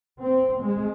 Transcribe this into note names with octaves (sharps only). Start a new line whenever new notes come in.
C4
G#3